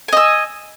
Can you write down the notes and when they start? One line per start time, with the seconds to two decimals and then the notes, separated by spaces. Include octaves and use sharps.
0.08 G#5
0.13 D#5
0.17 E6